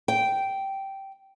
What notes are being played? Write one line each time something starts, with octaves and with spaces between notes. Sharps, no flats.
G5